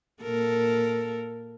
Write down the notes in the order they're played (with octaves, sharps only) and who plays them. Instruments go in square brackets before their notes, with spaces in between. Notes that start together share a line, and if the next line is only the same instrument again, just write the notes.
[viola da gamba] A#2 A4 A#4